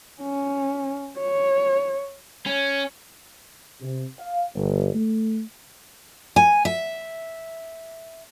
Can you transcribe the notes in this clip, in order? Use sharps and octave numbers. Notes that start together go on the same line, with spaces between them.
C#4
C#5
C#4
C3
F5
G1
A3
G#5
E5